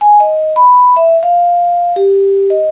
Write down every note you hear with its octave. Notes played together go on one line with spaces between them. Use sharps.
G#5
D#5
B5
E5
F5
G4
D#5